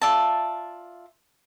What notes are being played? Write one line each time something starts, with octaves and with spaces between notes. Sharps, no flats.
F4 D5 E5 A5